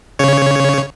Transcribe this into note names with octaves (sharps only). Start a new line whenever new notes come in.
C#3 C#5